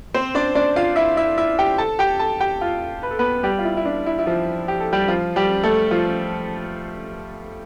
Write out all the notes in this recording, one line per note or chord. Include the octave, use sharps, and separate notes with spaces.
C4 C5
D4 D5
D4 D5
F4 F5
E4 E5
E4 E5
E4 E5
G4 G5
A4 A5
G4 G5
A4 A5
G4 G5
F4 F5
B4
A4
B3 B4
G3 G4
F4
E4
E4
D4
E4
E4
F3 F4
G4
A4
G3 G4
F3 F4
G3 G4
A3 A4
F3 F4